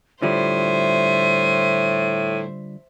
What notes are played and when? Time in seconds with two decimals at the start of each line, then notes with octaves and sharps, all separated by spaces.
0.22 A2 D3 F3 G3 C5 E5 D#7